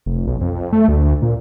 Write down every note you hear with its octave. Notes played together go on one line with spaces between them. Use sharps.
F1
B1
F2
A3
D2
A#2